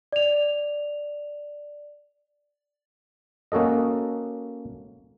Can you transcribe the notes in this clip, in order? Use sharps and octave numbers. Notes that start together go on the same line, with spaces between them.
D5 F7
A#3 C#4 F#4 A4 D#5